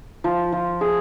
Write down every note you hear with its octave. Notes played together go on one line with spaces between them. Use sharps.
F3
F3
G#4